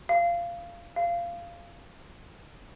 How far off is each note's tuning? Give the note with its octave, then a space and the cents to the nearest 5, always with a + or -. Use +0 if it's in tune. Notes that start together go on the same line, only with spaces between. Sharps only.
F5 -15
F5 -15